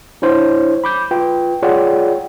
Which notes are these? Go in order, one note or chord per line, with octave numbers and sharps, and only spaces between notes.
D4 E4 C5 C#5
B5 D6 G6
F4 B4 G5
F4 G#4 C#5 D5 F#5 G5